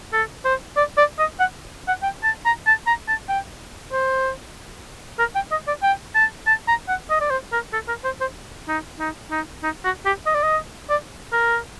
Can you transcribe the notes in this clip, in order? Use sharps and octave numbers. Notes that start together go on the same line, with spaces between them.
A4
C5
D5
D5
D#5
F#5
F#5
G5
A5
A#5
A5
A#5
A5
G5
C5
A#4
G5
D#5
D5
G5
A5
A5
A#5
F#5
D#5
D5
C5
A#4
A4
A#4
C5
C5
D#4
D#4
D#4
D#4
F#4
G4
D#5
D5
D#5
D5
A#4